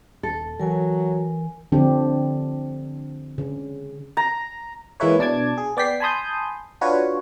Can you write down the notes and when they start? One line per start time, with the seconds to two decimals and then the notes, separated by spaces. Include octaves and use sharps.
0.23 D#1 A4
0.60 E3 F#3 A#4 G#5
1.72 D3 F3 C4 D4 G4
3.38 C#3
4.17 A#5
5.00 E3 G#3 A#3 E4 B4 C#5
5.19 B2 D4 A5 D6 G#6
5.58 G#4
5.77 B3 D5 G5 B6 C7
6.00 G#5 A5 B5 C6 D#6 G6
6.81 D4 F4 F#4 B4 C#5